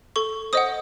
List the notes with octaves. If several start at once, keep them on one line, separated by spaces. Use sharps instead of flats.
A4 C#6
C5 D#5 F#5 D#6